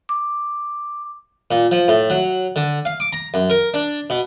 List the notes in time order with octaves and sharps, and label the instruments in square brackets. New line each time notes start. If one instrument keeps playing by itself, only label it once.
[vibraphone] D6
[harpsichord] A#2
F3
A2
F#3
D3
F5
D6
A#5
F#2
A#4
D4
B2